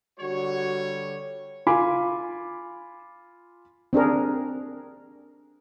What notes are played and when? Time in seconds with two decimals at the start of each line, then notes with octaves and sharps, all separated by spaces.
0.19 D3 G3 F#4 C#5
1.67 F4 G#5 B5 D6
3.93 C4 D4 G#4 A#4